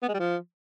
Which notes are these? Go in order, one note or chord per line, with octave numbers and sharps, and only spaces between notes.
B3
G#3
G3
F3